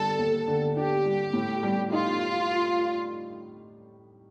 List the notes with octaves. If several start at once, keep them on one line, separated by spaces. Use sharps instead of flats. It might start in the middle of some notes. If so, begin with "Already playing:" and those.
Already playing: D3 G3 D4 A4
D#2
D3
D4 G4
G3
A2
G3
D#4 F4